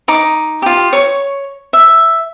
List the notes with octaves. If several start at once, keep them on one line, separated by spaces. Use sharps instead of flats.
D#4 D6
F4 G4
C#5 C#6
E5